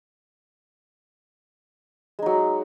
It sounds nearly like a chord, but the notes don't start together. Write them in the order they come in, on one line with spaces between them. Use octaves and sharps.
G#3 D#4 F#3